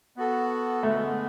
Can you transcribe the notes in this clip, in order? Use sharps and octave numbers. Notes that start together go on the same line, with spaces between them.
B3 F#4 A4
D3 G#3 A3 B3